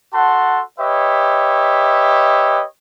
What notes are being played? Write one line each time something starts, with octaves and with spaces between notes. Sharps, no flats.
F#4 A4 F#5 A5 C6
G4 B4 C#5 D#5 E5